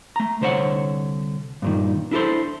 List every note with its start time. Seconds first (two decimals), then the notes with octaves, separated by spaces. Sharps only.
0.16 A3 A#5
0.41 C2 D3 C5 C#5 F#5
1.62 G2 A#2 D#3
2.11 D4 E4 G#4 A4 C5